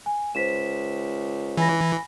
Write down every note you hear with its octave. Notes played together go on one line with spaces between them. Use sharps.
G#5
C#2 C5 B6 E7
E3 G#5 B5 A#6